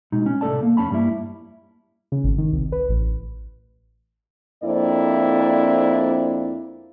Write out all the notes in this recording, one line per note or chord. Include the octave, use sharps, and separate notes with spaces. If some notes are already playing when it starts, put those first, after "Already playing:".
B2 G#3 D#4
C#4
C2 A2 A3 A4 D5 A5
A#3
F2 C#4 A5 B5
G2 G3 A#3 E4
C#3
G#1
D#3
C2
B4
A1
F2 A#3 C4 D4 E4 D5